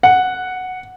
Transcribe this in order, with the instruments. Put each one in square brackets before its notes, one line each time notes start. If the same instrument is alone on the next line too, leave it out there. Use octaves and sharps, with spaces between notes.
[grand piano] F#5